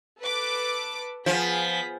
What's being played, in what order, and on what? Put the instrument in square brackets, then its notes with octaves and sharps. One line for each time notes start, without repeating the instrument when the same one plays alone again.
[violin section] A4 B4 D6
[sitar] F3 [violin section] B3 G#4 B6